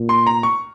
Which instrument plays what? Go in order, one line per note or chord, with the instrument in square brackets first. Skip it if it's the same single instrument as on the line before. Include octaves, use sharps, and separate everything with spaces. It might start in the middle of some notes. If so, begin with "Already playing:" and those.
Already playing: [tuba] A#2
[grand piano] C6
A#5
C#6